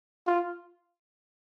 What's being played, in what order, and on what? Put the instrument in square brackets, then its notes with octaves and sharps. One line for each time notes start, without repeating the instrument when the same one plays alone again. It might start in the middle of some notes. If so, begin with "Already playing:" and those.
[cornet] F4